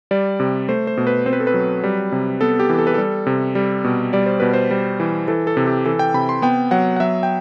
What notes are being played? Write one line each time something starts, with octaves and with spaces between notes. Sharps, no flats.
G3 D5
C3
A3 C5
C5
B2
B4
C4 C5
B4
A4
B4
F#3
G3
C3
B3 A4
G4
E3
A4
B4
G3 A4
C3
G3
B2
G3 D5
C5
B2 B4
C5
G3
E3
E3 A4
A4
C3
G4
E3 A4
G5
C3 B5
C6
B3 G5
F#3 F#5
F#5
F#3 E5
G5